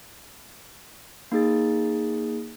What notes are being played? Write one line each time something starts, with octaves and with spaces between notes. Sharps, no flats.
A#3 D#4 G#4 A6